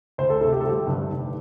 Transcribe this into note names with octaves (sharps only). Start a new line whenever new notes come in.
D2 C5
A4
C3 A3 A4
G4
G1 A4
G4
G2 D3 G3
F1